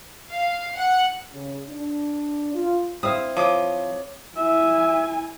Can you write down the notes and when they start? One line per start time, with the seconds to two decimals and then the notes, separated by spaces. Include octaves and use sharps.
0.30 F5
0.76 F#5
1.33 C#3
1.69 D4
2.54 F4
3.03 C4 E4 F5 D#6
3.37 F3 C#5 D6 D#6
4.36 E4 E5 G#5